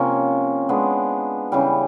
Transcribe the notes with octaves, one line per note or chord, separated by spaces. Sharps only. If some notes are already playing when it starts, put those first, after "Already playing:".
Already playing: C3 F3 A#3 C#4
G#3 B3 D4
C#3 E3 G3